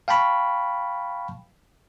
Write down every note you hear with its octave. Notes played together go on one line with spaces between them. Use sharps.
F5 G5 A5 B5 C#6